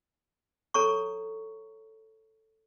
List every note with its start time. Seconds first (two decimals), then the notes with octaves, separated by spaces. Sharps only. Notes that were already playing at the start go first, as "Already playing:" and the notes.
0.74 A4 C#5 A#5 C#6